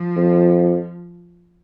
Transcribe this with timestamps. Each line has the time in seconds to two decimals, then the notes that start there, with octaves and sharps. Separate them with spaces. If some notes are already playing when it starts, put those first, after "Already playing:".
Already playing: F3
0.16 F2